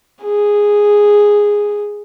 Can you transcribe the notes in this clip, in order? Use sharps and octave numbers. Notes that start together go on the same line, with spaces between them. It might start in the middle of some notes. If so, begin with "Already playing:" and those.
G#4